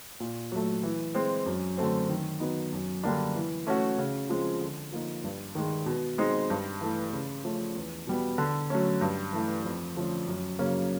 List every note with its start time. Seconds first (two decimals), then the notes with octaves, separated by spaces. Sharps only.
0.20 A#2
0.52 F#3 A3
0.83 E3
1.15 G#3 C4
1.46 F#2
1.78 D3 F#3 A3 C4
2.09 D#3
2.40 F#3 B3 D#4
2.72 F#2
3.04 D3 G3 A#3 D4
3.35 E3
3.67 A3 C#4 F#4
3.98 C#3
4.29 F3 G#3 C4
4.61 D3
4.92 F3 A#3 D#4
5.24 G2
5.55 D#3 G#3
5.86 B2
6.18 G#3 C4 D#4
6.50 G2
6.81 E3 A3
7.13 C#3
7.44 F3 A3 C#4
7.76 E2
8.07 B2 G3 B3
8.38 D3
8.70 F#3 A3 C#4
9.01 G2
9.33 E3 A3
9.64 F2
9.96 D3 F3 A3 C#4
10.27 F#2
10.59 C#3 F#3 A#3 C#4